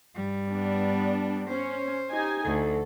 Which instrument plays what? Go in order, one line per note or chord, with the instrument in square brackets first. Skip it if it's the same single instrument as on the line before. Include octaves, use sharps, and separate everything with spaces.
[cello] G2 G3
[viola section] B3 D4
[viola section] C#4 [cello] C5
[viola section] D#4 G4 G#5
[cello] D2 [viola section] A4